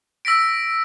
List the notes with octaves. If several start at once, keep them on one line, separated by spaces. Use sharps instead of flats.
E6 A#6 B6 D7